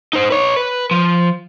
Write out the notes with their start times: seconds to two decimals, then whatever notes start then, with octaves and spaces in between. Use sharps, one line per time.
0.13 D#4 C5
0.30 B4 C#5
0.57 B4
0.91 F3